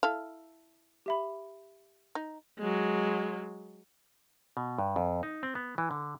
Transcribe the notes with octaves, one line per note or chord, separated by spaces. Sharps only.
E4 A4 F5
G4 E5 B5
D#4
F#3 G#3
B2
G2
F2
D#4
C4
B3
E3
D3